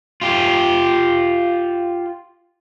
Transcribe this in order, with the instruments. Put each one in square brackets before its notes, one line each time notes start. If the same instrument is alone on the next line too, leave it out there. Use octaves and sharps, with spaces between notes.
[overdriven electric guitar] F4 G4